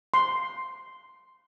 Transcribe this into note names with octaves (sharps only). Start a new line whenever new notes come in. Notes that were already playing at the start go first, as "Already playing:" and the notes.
C6